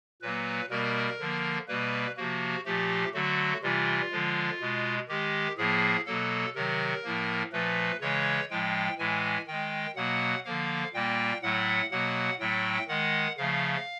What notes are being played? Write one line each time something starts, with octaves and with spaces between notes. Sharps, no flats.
A#2 F#3 A#3 B4
B2 G3 A#3 A#4
D3 F3 A#3
B2 G3 A#3 B4
C3 F3 A#3 F#4
A#2 F3 A3 G4
D3 F#3 A3 F#4
C3 E3 G3 F4
D3 F3 G#3
B2 G#3
D#3 G#3 G4
A2 F3 A#3 G#4
B2 F#3 A#3 A4
C3 D#3 F#3 A#4
A2 F3 A#3
A#2 F3 A3 B4
C#3 E3 G#3 C#5
A2 F3 G#3 G5
A2 E3 G#3 G#5
D#3 G#3 G5
B2 F#3 A#3 F#5
D3 F3 A#3 F5
A#2 G3 A#3 G5
A2 F#3 A3 F#5
B2 F#3 A#3 F#5
A2 F#3 A3 G5
D#3 G#3 F#5
C#3 F3 A3 F5